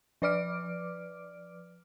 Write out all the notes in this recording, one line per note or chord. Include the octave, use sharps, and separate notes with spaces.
F3 B4 D5 D6 F6 D7